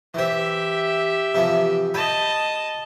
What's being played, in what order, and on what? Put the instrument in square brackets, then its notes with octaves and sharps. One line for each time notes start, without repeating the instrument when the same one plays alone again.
[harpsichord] E3 C5 [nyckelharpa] G4 E5
[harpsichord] C3 E3 F3
[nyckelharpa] D#5 A5 [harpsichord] G5 B5